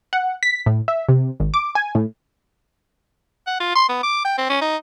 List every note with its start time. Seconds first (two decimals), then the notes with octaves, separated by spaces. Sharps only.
0.13 F#5
0.43 B6
0.66 A2
0.88 E5
1.09 C3
1.40 G#1
1.54 D6
1.75 G#5
1.95 A2
3.47 F#5
3.60 F4
3.75 C6
3.89 B3
4.03 D6
4.25 G5
4.38 C4
4.50 C#4
4.62 D#4